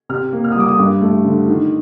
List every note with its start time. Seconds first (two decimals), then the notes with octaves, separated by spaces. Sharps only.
0.09 C3 F6
0.33 A#3
0.44 F6
0.52 D#6
0.56 G3 D6
0.68 D#6
0.79 G2 D6
1.01 A3
1.25 D3
1.48 D#3